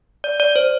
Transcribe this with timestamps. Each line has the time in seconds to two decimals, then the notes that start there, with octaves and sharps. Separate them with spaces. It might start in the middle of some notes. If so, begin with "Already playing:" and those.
0.24 D5
0.40 D5
0.56 C5